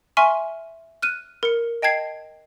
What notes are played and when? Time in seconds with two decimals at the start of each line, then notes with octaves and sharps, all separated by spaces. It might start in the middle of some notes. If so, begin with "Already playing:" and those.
0.17 E5 G#5 C6 C#6 F6
1.02 F6 F#6 D#7
1.43 A#4 C#7
1.82 D#5 G5 A5 G#6 C7